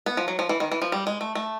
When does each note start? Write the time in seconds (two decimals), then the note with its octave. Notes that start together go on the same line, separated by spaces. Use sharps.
0.06 B3
0.17 F3
0.28 F#3
0.39 F3
0.49 E3
0.60 D#3
0.72 E3
0.82 F3
0.92 G3
1.07 G#3
1.21 A3
1.35 A3